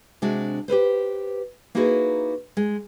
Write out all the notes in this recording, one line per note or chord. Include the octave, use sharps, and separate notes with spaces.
C3 G#3 D4 F#4
G4 A4 B4 C5
A#3 D#4 E4 F#4 G#4 B4
G#3